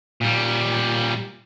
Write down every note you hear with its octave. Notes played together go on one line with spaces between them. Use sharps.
A#2 G3